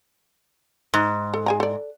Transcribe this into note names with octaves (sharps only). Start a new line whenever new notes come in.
G#2
A4
G#4 G#5 A#5
A4 D5